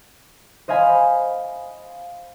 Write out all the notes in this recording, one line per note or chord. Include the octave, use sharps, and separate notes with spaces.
C5 D#5 F5 G#5 B5